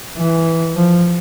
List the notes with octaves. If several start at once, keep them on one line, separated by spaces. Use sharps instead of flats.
E3
F3